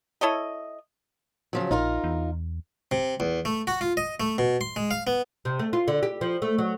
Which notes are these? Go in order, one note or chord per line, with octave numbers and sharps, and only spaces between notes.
E4 A4 C#5 D#5
C#3 F3 F#3
A#1 D#4 F4 A#4
E2
C3
E2
A3
F#4
F4
D#5
A3
B2
C6
G#3
F5
B3
C3
A3
F4
D3
G4
F3
A3
F#3